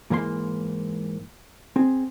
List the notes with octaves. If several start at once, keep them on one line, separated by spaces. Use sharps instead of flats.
G#2 E3 A#3 A#4 C6
C4 G#4